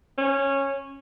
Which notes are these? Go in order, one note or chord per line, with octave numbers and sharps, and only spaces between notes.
C#4